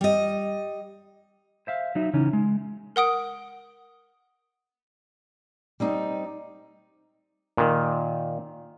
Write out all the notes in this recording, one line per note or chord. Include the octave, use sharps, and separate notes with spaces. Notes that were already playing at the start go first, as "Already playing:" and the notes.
G3 D#5
C5 E5 F5
F#3 D#4 E5
C#3 E3 C#4 D#4
G#3
A#4 F#5 D#6 D7
G3 C4 D#4
A#2 D#3